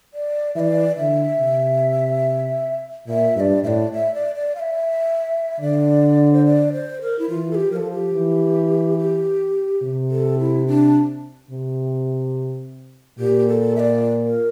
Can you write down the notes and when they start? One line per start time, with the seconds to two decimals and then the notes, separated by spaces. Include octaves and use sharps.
0.14 D5
0.55 E3 D5 E5
0.97 D3 E5
1.39 C3
3.07 A#2 E5
3.36 G2 E5
3.40 D5
3.64 A2 D5 E5
3.92 E5
4.14 D5
4.35 D5
4.55 F5
4.59 E5
5.60 D3 D5
6.33 C5
6.46 D5
6.73 C5
7.01 A#4
7.19 E4
7.29 E3 F4
7.51 A4
7.55 G4
7.71 F3 A4 A#4
7.92 G4
8.13 E3
8.98 G4
9.82 C3
10.10 A4
10.39 E4
10.67 D4
11.51 C3
13.19 A#2 G4
13.48 A4
13.76 E5
13.79 D5
14.25 A#4